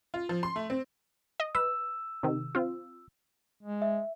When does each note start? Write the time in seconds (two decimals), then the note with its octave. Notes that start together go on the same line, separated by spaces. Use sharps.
0.14 F4
0.29 F3
0.43 C6
0.56 A3
0.70 C4
1.40 D#5
1.55 B4 E6
2.23 C3 D#3
2.55 C4 F4
3.63 G#3
3.82 E5